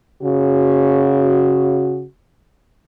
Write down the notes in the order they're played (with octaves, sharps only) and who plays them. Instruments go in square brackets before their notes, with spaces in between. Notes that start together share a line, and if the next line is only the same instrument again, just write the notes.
[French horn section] C#3 F#4